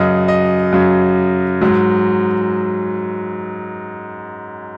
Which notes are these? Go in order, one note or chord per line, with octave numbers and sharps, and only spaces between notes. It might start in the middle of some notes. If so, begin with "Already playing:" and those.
Already playing: F#2 C#3 F#3 D#5
D#5
F#2 C#3 F#3
G#2 F#3